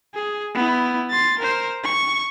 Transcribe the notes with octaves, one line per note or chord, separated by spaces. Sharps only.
G#4
B3 E4
C6 A6
A#4 C5
C#6